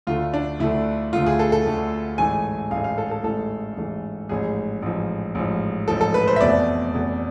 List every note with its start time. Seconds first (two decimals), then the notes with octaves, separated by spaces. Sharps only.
0.07 D2 D3 A3 F4
0.34 D4
0.59 D2 D3 A3 E4
1.13 D2 D3 A3 F4
1.26 G#4
1.39 A4
1.52 A4
1.66 D2 D3 A3
2.18 A1 G#2 E3 A3 G#5
2.71 A1 G#2 E3 A3 F5
2.84 F5
2.98 A4
3.11 A4
3.24 A1 G#2 E3 A3 A4
3.77 A1 G#2 E3 A3
4.29 A1 G#2 F3 G#4
4.82 A1 G#2 F3
5.35 A1 G#2 F3
5.88 A1 G#2 F3 A4
6.01 A4
6.14 B4
6.28 C5
6.36 E5
6.41 F1 E2 B2 A3 D5
6.93 F1 E2 B2 A3